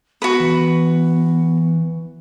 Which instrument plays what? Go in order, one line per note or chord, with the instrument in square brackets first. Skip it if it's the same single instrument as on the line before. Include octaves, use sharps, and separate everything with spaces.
[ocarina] B3 [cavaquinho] F#4 B4
[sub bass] E3